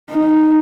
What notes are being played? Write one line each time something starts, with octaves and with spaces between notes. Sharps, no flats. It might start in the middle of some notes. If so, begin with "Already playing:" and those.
D#4